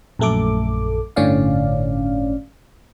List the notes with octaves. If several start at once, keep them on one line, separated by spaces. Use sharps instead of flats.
A#1 F#2 A3 A4 D6
G1 A2 D3 C#4 D5 F5